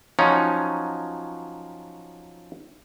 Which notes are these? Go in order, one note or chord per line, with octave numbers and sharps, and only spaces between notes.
F3 F#3 C#4 D#4